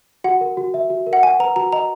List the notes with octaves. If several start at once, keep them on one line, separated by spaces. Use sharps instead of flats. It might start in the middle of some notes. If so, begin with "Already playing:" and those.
F#4 F#5
A#4
F#4
E5
F#4
A#4
F#5
F#5 G#5
B4 A#5
F#4 A#5
D#5 A#5